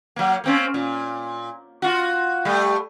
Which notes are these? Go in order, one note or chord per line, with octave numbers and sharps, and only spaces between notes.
F#3 A#3
A#3 C4 C#4
A#2
F4 F#4
G3 A3